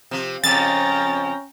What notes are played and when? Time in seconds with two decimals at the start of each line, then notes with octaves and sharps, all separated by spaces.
0.11 C3 F3
0.44 F2 C#3 C#4 G5 A#5 A6